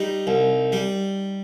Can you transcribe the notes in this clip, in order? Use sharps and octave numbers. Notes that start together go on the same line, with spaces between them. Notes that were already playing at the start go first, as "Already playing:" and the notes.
Already playing: G3 D#4
C2
G3